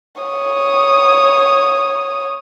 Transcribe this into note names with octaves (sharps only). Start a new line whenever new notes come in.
C#5 D#6